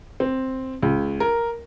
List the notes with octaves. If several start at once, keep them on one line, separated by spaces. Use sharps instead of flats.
C4
C#2
A#4